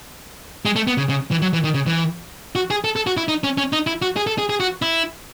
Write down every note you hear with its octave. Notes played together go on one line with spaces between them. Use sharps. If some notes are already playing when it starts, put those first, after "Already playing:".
G#3
A3
B3
C#3
C#3
E3
F#3
E3
D#3
C#3
E3
F#4
G#4
A4
A4
F#4
E4
D#4
C#4
C#4
D#4
E4
F#4
G#4
A4
G#4
G#4
F#4
E4